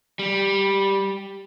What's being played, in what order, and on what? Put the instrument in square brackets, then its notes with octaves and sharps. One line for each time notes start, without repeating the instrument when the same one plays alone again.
[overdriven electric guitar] G3